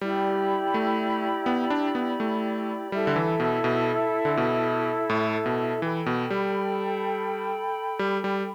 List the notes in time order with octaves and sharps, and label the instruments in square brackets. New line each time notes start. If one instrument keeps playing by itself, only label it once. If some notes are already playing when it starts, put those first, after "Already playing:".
[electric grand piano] G3 [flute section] E4 G4 D5 B5
[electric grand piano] A3
B3
D4
B3
A3
[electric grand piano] G3 [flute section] E4 A4 E5
[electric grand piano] D3
E3
B2
B2
D3
B2
A2
B2
[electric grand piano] E3 [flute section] A4 G5 B5
[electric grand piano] B2
G3
G3
G3